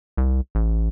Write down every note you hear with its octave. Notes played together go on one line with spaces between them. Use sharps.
C2
A1